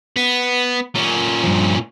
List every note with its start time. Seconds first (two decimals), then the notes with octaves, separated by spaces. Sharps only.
0.17 B3
0.95 A#2 C#4
1.44 G2 F3